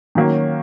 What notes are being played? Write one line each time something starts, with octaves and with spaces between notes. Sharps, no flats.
D#3 F#3 A#3 C#4